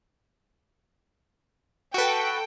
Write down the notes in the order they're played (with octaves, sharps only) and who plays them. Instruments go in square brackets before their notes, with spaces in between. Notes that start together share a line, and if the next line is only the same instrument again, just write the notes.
[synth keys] F#4 B4 [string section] A4 G5